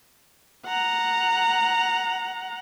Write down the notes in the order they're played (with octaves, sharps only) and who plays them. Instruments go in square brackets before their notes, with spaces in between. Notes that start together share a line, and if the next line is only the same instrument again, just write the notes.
[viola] F#5 A#5